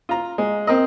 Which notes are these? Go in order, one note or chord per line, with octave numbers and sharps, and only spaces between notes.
F4 A#5
G#3
C4 A#4 D#5